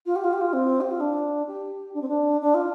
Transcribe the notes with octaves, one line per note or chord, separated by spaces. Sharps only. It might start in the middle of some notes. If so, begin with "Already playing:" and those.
F4
G4
F4
G4
F4
C4
G4
F4
D4
G4
D4
C4
D4
D4
F4